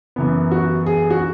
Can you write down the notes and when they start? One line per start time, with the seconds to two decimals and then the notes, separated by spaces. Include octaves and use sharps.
0.16 F#2 E3 B3
0.52 F#4
0.86 G#4
1.10 F#4